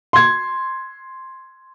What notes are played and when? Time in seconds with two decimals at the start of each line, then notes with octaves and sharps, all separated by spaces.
0.13 C6 G#6